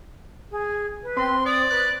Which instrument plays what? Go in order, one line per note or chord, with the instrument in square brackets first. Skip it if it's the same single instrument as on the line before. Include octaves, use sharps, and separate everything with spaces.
[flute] G#4
B4
[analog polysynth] C4 [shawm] C6
[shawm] D5 [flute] D#6
[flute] B4 [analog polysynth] F#6